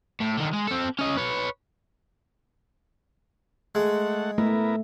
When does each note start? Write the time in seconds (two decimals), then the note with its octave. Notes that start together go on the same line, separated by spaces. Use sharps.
0.20 A2
0.37 D3 D#3
0.53 G#3
0.67 C4 A4
0.99 C#4 D#5
1.17 B4 C#5
3.75 G#3 A3 F#5
4.38 A3 B3 E4 A#4